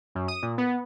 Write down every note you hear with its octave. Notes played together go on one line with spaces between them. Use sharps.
F#2
D#6
A#2
B3